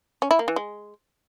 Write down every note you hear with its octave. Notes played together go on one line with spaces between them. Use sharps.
C#4
E4
A#3
E3
G#3